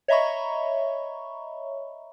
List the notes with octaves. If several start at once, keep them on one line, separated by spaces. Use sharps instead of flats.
C#5 D#5 E5 A#5 B5 C#6